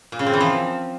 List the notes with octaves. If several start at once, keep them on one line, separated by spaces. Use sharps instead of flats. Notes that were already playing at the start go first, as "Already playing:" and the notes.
A#2
C#3
C4
E3
F3